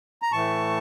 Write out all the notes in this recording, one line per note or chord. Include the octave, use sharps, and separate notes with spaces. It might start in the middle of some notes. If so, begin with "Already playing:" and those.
A#5
A2 E3 A3 A5 C#6